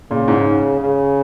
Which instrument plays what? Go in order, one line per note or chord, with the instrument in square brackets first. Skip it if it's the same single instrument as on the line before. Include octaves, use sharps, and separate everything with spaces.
[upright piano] A#2 [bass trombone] C#3
[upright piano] G#2
[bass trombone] C#3